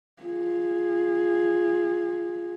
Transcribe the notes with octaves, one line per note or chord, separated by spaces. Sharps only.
F4 G#4